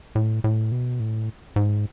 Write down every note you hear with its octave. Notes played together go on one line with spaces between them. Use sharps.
A2
A2
B2
A2
G#2